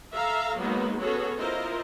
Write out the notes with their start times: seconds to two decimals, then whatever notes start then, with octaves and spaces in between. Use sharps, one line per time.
0.13 A4 E5 F5 A#5
0.58 F#3 G#3 A#3 B3 D#4
1.00 B3 C#4 F#4 G#4 A4 C#5
1.39 E4 F4 A#4 C5 D#5